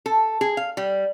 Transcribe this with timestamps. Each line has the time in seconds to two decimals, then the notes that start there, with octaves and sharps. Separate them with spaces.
0.06 A4
0.41 G#4
0.57 F5
0.77 G3